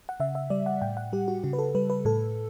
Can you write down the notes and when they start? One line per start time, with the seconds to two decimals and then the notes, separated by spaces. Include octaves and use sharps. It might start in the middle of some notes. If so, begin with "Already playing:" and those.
0.09 F#5
0.20 C#3 E5
0.35 E5
0.50 G3 D5
0.66 F#5
0.82 A2 G5
0.97 F#5
1.13 G3 G4
1.28 F#4
1.44 C#3 F#4
1.53 B4
1.59 A4
1.75 G3 B4
1.90 B4
2.05 A2 A4